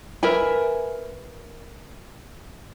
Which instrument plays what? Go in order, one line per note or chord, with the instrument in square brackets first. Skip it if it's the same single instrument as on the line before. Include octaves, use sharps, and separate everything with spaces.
[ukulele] A#4 B4 E5 G#5